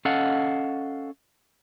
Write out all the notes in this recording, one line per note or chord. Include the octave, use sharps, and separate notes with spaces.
C#4 A4 D#5 F5 F#5